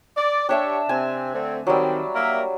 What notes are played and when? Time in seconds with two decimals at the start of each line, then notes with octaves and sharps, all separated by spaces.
0.17 D5
0.49 D4 G4 C#5 E5 A5
0.89 C3 C4 G#5
1.34 D3 A3 C4
1.67 D#3 F#3 G3 C4
2.15 A#3 A#4 E5